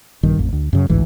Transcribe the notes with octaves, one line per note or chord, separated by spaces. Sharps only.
A#1 G2 D#3
A1 F2
D2
F#2 C#3
A1 D2 G#2 E3